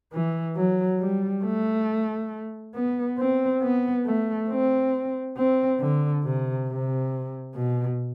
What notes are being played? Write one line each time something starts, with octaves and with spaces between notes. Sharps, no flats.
E3
F#3
G3
A3
B3
C4
B3
A3
C4
C4
D3
C3
C3
B2